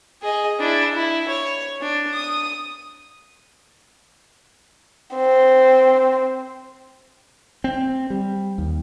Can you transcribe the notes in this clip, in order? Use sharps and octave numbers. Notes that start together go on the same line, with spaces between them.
G#4 D#5
D4 E4
E4
C#5
D4
D#6
C4
C4
G3
D#2